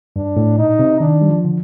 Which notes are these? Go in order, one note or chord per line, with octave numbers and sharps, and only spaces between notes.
G2 D4
A2
A#2 D#4
C3
D#3 D4
G3
F3
D3